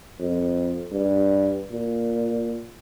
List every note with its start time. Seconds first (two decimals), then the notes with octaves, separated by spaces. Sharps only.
0.20 F2
0.92 G2
1.71 A#2